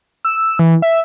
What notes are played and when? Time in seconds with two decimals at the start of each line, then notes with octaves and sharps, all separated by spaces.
0.25 E6
0.59 E3
0.82 E5